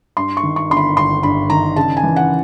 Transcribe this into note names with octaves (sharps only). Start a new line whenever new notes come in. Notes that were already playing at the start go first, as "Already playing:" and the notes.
G2 C6
C#6
D#3
C#6
G1 C6
B5
G1 C6
G2 B5
D#3 A#5
C#3 A5
G#5
E3
F#5